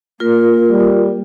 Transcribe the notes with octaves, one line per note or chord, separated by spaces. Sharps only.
A#3 F4 A#4
G3